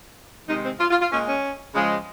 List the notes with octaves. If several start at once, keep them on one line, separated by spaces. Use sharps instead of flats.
C3 D#3 G#3 D#4
C4
F4
F4
F4
A#2 G#3 C#4
C#4
C#3 F3 G#3